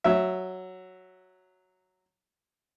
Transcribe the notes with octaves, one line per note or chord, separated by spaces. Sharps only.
F#3 E5